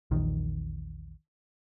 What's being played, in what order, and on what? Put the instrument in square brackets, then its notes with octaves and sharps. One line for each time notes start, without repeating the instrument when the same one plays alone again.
[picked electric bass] A#1 E2 D#3